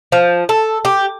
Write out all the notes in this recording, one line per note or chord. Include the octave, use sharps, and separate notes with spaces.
F3
A4
G4